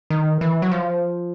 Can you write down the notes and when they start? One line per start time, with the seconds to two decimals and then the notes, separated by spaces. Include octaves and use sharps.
0.10 D#3
0.41 E3
0.62 F#3
0.71 F3